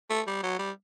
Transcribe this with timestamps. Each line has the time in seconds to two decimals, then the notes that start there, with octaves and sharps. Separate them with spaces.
0.10 A3
0.27 G3
0.43 F#3
0.59 G3